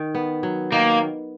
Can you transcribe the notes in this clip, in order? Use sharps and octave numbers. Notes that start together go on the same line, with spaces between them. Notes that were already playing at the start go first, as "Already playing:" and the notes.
Already playing: D#3
B3
F#3
D#3 A#3